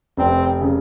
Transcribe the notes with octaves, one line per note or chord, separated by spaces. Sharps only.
F1 C4
C#3